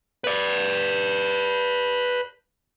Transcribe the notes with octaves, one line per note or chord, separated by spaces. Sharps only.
B4 D5